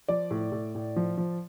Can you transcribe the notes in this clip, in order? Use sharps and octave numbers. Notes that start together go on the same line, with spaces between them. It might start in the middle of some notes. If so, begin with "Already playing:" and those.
F3 D5
A2
A2
A2
F3
F3